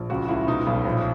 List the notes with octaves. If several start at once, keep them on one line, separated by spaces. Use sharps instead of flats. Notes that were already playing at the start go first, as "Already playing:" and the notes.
Already playing: A#1
C#2 F#4
C#2 E4
B2 D#4
B1
A#1